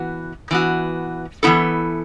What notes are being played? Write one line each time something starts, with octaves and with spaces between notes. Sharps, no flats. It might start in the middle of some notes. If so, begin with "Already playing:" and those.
Already playing: E3 B3 F#4
E3 B3 F#4
E3 B3 E4 A4